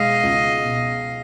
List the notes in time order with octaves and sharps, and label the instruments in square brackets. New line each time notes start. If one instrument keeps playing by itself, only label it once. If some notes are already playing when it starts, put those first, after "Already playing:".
Already playing: [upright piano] B2 G#3 [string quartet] D#5 F5
[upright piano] C#2
B2